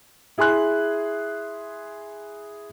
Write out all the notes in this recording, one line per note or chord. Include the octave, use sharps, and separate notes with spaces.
E4 G#4 G#5 C6 F#6